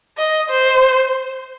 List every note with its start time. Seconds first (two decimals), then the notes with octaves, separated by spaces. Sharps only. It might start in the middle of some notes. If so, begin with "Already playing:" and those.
0.18 D#5
0.50 C5